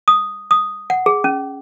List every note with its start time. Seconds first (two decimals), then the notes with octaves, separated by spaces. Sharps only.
0.08 D#6
0.51 D#6
0.90 F#5
1.06 G#4
1.24 C#4